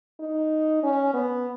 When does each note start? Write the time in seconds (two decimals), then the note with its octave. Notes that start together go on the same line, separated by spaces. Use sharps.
0.20 D#4
0.83 C#4
1.14 B3